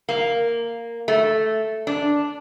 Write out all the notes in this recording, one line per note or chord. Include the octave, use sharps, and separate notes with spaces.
A#3
A3
D4